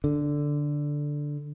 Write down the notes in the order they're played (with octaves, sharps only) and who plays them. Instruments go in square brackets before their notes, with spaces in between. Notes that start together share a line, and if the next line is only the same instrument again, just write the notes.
[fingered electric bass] D3